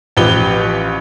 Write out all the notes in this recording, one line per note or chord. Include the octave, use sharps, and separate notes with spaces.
A1 F3 G4 B4 G7